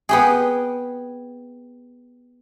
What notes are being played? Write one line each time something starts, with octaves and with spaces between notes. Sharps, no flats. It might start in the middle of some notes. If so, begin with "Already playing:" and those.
B3 G4 G#4